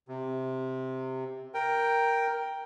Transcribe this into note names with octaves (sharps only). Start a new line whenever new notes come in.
C3
A#4 G5